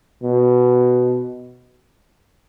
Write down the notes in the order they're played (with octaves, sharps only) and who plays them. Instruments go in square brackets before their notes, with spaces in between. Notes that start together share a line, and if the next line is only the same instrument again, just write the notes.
[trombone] B2